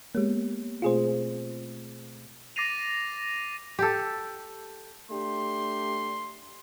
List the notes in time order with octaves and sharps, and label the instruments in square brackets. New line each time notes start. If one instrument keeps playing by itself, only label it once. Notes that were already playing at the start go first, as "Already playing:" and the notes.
[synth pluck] G#3 A#3 [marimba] B3 G4 C#5
[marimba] B2 A3 C4 [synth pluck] F4 G#4 C5
[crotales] D6 A6 A#6 C7 D#7 F7
[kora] G4 A4
[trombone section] A3 D4 G4 [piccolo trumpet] C6